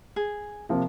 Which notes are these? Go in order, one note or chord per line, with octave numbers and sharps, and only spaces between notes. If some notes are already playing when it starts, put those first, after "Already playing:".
G#4
C3 F3 A#3